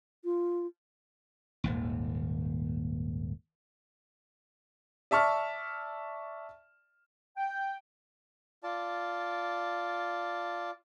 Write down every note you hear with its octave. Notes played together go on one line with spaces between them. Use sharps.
F4
D#1 G#1 D#2
D5 E5 A5 C#6 F6
G5
F4 D5 A5